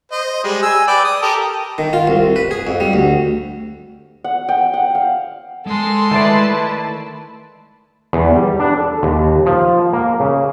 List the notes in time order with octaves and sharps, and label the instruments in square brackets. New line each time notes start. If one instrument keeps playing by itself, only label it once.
[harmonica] C5 D#5
G3 G#3
G#5 E6
B4 D5 G5
D#6
G4 A4 A#4
[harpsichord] D#3
F4
C2
B4
G#4
F2
G3
D2
[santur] F#5
G5
F#5
F5
[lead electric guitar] G#3 G#5 [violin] A4 C6
[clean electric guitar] D#3 A3 D5 [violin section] E4 B4 A5
[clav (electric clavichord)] E2
G3
D4
A4
D#2
F3
A#3
C#3